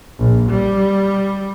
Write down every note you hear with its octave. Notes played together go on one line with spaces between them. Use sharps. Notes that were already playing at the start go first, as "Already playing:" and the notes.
A#1
G3